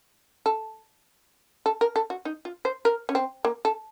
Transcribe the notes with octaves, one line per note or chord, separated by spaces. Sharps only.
A4
A4
A#4
A4
F#4
D#4
F4
C5
A#4
C#4
C4
A#3
A4